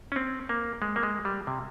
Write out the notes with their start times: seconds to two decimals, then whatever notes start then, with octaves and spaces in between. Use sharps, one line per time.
0.12 C#4
0.16 C4
0.49 A#3
0.82 G#3
0.96 A#3
1.03 G#3
1.25 G3
1.47 C3